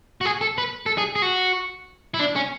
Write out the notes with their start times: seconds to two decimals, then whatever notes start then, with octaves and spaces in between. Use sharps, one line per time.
0.21 F#4
0.25 G#4
0.41 A4
0.58 B4
0.86 A4
0.98 G#4
1.16 G#4
1.22 F#4
2.14 E4
2.20 D4
2.36 C#4